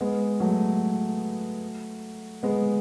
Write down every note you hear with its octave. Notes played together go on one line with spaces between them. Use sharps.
G#3 B3
F#3 A3
G#3 B3